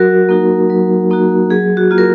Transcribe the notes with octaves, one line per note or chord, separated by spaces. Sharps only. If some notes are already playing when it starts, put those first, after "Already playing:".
Already playing: F#3 F#4 A#4
A#3 D#4 F#4
F#3
A#3 D#4 F#4
F#3 G#4
F#4
A#3 F4
A#4